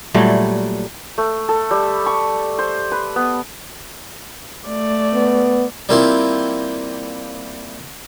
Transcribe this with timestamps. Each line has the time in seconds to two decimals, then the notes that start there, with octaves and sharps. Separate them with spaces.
0.14 A#2 F#3 G3 A3
1.18 A3
1.49 A4
1.71 G3
2.06 C#6
2.59 C5
2.92 B4
3.16 B3
4.68 A3 D5
5.14 B3
5.89 G3 A#3 C4 E4 F4